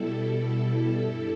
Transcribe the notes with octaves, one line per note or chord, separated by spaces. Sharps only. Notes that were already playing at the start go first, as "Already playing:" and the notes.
Already playing: B2 G3 E4 A4
G2 G3 E4